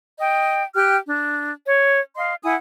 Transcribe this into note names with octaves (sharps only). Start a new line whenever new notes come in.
D#5 G5
G4 G5 F6 F#6
D4
C#5
D#5 F5 C6
E4 F#5 G#5 D#6